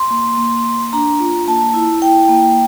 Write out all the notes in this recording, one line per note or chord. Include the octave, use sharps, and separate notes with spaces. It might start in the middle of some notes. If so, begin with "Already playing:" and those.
Already playing: C6
A#3
A#3
A#3
D4 A#5
F4
A#3 A5
E4
E4 G5
A#3